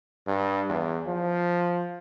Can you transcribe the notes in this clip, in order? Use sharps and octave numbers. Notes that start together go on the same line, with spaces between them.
G2
E2
F3